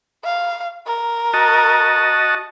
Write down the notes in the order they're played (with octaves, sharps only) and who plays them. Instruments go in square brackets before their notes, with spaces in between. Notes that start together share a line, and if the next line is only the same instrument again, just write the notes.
[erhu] F5
A#4
[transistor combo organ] F#4 D#5 A5